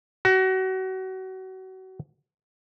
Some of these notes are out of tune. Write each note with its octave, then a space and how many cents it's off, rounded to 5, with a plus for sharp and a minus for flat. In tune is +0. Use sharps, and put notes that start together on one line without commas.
F#4 +30